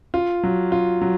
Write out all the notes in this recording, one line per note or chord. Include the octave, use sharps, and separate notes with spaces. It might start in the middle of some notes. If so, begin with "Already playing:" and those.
F4
F#3
F4
F#3